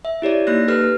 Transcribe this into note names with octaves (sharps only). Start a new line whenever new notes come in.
E5
E4 G4 C#5 D5
A#3 D#4 F#6 A#6
G4 A4 B4 F6